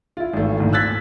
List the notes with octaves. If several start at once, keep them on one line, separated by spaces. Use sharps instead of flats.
E4 F4
G#1 E3 A3
G#1 D2 A#2
E6 F#6 G#6 A6 B6